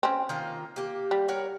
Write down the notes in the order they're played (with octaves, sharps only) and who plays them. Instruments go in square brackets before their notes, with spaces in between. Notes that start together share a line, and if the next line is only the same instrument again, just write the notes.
[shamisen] C4 C#4
[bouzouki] D#3 A#3 F4
A#3 G4
[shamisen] G3
[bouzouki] A#4 C#5 F#5